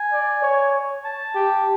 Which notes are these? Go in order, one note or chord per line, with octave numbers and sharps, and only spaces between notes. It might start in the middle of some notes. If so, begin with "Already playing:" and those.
Already playing: G#5
D5
C#5
A5
G4